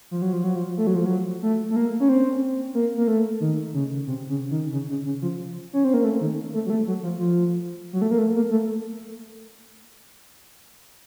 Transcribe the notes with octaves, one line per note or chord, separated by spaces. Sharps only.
F3
F#3
F3
F#3
F3
A3
F#3
F3
F#3
A3
A3
A#3
C#4
C4
A#3
A#3
A3
D#3
C#3
C3
C#3
D#3
C#3
C#3
C#3
F3
C#4
C4
A#3
A3
D#3
A3
F#3
A3
F#3
F3
F3
F#3
A3
A#3
A3
A#3
A3